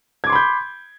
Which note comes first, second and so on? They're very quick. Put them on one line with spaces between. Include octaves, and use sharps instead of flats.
G#6 D6 C6 B5 G6